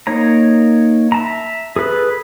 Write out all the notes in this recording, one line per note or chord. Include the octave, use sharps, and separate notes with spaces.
A#3 D#4 C#5 A#5
E5 A5 A#5
G#4 A4 B4 B5